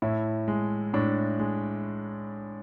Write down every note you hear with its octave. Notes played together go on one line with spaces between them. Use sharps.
A2 E4
G#3
A2 D4
G#3